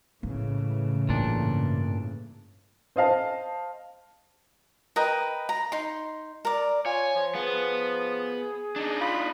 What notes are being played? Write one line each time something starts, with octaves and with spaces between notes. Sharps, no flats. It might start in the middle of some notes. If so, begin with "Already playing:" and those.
A2 C#3 E3 A#3
G2 A#2 D4
C5 D#5 F5 A5
A#4 B4 D#5 G5
A#5
D#4 C6
A#4 D5
F4 C#5 G#5
F3
F3 B3 G#4
D4 D#4
F4 B5